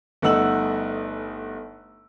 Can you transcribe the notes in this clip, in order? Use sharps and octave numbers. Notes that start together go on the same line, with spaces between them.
G1 A3 D#4 F#5 E6 F#7